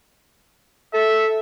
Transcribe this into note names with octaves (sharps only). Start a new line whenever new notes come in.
A4 E5